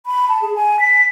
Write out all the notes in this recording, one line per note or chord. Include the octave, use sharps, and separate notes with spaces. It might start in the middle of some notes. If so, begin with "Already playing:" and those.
B5
A5
G#4
G#5
B6